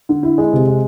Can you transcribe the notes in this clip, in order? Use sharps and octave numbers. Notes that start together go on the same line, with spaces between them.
D3
E4
G#3
C3
G#3